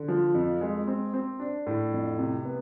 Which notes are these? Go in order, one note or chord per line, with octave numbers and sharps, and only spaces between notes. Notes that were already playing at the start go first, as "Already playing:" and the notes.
Already playing: D3
F3
F2
G#3
C4
C4
D4
A2
F2
C3
B3